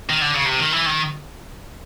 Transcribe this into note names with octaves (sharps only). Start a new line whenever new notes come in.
D#3
D3
C#3
C3
D#3
E3
D#3